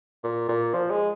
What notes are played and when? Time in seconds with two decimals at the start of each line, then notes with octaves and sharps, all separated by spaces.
0.23 A#2
0.48 A#2
0.74 F3
0.91 G#3